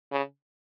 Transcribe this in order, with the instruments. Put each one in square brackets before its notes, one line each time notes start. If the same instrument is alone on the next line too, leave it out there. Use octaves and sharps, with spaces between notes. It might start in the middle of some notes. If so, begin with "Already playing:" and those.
[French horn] C#3